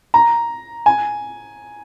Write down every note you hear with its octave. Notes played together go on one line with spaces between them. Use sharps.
A#5
G#5